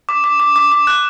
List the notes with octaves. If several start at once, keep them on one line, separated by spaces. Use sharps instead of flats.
D6
D6
D6
D6
D6
F#6